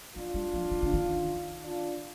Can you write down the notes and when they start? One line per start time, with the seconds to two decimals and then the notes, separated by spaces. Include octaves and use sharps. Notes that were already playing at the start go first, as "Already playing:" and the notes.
0.16 F3 D4 F4
0.34 G3
0.54 F3
0.71 D#3
0.82 D3
0.93 D#3
1.63 D4 F4